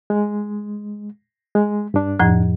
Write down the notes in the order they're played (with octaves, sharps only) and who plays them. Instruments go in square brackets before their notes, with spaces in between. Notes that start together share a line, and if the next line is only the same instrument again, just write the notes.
[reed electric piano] G#3
G#3
G2 D4
[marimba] F2 A2 F3